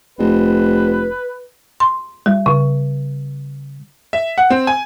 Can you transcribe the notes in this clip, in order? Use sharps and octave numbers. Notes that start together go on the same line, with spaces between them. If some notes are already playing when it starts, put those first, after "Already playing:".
F1 B4
C6
G3
C#3
E5
F#5
C4
G#5